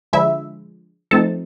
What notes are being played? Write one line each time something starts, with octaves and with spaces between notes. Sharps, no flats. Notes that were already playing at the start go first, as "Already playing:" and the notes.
D3 F3 G#3 E4 E5
F3 A3 C4 D#4 A4 A5